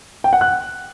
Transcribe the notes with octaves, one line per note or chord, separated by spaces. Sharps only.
G5
F#5
F#6